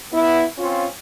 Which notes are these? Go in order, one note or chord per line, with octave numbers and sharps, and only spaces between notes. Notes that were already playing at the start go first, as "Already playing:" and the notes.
B3 E4
C4 C#4 F4